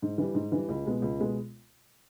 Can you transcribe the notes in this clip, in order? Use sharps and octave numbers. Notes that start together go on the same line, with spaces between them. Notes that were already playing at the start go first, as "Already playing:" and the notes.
G#2
E3 G3
G#2
E3 G3
C#2
B2 G#3 B3
C#2
B2 G#3 B3